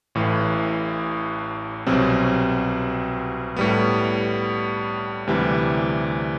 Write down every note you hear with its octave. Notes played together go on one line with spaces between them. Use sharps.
A1 A2 E3
C2 B2 F#3 C4 G4
A2 G3 B3
D2 C3 E3 G3